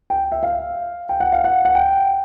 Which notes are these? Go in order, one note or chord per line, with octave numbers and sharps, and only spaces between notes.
G5
E5
F5
G5
F#5
F5
F#5
F#5
G5